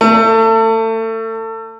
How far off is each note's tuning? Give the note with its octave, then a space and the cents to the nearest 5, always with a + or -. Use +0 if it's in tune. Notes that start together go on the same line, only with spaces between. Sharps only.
A3 +30